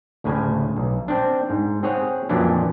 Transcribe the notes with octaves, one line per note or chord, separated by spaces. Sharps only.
D2 A2 C#3 G#5
B1
C4 D4
G#2
C4 G#4 C#5 F#5
F2 A#2 E3 F#3 C#4 D4